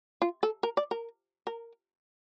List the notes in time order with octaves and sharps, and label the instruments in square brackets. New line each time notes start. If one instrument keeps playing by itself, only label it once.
[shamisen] F4
A4
A#4
D5
A#4
A#4